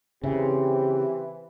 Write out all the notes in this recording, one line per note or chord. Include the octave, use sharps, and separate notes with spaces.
C#3 E3 C4 G4